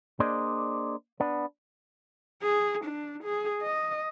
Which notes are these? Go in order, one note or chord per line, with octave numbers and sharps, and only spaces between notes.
A#3 D4 G#4 C5 D5 D#5
B3 D4
G#4
D4
G#4
D#5